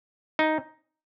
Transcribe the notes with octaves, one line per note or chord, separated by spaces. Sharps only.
D#4